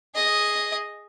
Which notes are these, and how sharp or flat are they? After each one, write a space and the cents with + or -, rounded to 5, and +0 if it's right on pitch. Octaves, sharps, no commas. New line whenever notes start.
G#4 +0 D#5 +0